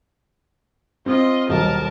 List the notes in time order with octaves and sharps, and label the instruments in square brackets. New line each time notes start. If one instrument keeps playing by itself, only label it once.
[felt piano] C4 [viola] F4 D#5
[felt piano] D#1 B1 [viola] A#4 A5